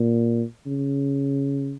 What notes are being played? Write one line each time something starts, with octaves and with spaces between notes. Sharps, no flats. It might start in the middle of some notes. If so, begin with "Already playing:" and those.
Already playing: A#2
C#3